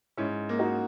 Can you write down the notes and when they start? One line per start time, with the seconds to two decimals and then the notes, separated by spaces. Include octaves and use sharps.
0.17 G#2 C#4 E4
0.49 A#3
0.59 D#4 F#4